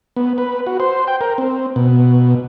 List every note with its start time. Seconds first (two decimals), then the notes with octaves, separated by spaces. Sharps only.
0.16 B3
0.38 B4
0.67 F#4
0.80 C5
1.08 G5
1.21 A#4
1.38 C4
1.76 B2